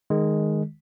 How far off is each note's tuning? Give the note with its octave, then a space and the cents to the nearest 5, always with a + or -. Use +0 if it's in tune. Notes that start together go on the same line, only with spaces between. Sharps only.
D#3 -10 G#3 +0